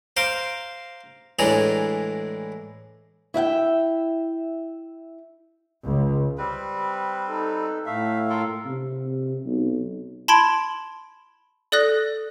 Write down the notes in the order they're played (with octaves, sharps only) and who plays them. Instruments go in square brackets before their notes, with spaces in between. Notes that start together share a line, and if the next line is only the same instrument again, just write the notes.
[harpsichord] C5 F5 A#5 C6 D6
A2 E3 G#3 D4 G#4 A#5
[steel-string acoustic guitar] E4 E5 F#5 G5
[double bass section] C#2
[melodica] G3 C4 B4
[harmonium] D#4 A4
[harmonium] A2 F5 [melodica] A3 E5
[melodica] F4 A4 A#4
[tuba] C3
B1
[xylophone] A5 B5 C6 G#6 D7
A4 D5 D#6 F#6 A#6